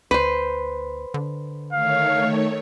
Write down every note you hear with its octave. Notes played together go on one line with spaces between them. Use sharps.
D2 B4 C5
D3
D#3 A3 C#5 F5